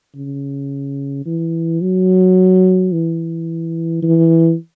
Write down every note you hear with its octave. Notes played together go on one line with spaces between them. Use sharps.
C#3
E3
F#3
E3
E3